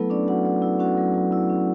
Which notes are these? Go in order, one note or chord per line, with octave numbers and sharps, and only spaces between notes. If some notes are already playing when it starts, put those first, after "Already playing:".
Already playing: F#3 A3 B3 E4 A4 B4
C#4 D4 D5
F#3 F#4 F#5
F#3
E4
C#4 F#4 F#5
F#3
F#3
E4
C#4